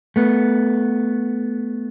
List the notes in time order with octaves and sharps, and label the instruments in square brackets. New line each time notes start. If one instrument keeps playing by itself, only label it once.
[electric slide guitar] A3 B3